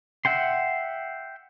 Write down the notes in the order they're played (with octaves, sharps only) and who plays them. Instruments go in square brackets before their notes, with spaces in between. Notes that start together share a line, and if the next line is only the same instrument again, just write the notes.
[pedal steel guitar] E5 F#5 G5 C6